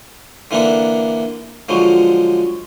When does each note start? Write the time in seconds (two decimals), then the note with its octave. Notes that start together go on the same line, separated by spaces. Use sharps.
0.51 D3 E3 A#3 D4 A4
1.69 D3 F3 F#3 G#3